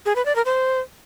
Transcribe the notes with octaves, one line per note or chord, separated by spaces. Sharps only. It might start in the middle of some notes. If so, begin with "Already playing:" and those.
G#4
B4
D5
A#4
C5